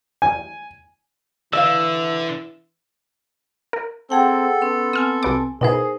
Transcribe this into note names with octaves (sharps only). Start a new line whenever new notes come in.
G#5
D3 E3 D5 E5 F5 E6
A#4
C4 G#4 A4 F#5 G5
B3 C#4 C6
C4 G#5 D#6 F6
C2 B3 D6
B2 B3 D#4 E4 G#4 A#4 C5